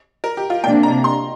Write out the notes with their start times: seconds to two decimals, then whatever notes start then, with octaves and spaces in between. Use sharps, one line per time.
0.24 A#4
0.37 G4
0.50 F4
0.64 C3 A#3 D4 G5
0.83 A#5
1.04 C6